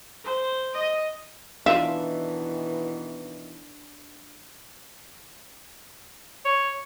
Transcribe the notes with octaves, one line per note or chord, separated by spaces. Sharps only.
C5
D#5
B2 D#3 E3 D4 F4 A#4 E5 F5
C#5